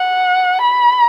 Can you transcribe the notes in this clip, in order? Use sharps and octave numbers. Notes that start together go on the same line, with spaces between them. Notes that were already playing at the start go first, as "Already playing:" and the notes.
Already playing: F#5
B5